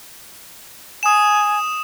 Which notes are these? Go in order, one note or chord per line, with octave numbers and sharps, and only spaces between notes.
G#5 D#6 E7